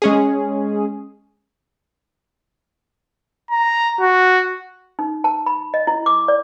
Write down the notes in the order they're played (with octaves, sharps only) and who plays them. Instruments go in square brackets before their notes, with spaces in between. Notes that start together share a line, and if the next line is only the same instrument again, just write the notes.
[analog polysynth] G#3 C#4 G#4
[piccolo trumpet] A#5
F#4
[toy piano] D#4
A5
B5
D#5
E4
D6
D5